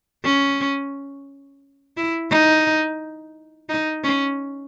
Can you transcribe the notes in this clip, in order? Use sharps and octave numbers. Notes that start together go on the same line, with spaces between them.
C#4
E4
D#4
D#4
C#4